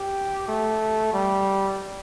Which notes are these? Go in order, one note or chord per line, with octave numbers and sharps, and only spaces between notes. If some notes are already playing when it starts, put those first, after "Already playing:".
Already playing: G4
A3
G3